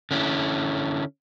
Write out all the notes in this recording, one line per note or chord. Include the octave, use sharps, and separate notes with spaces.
D3 C#4 E4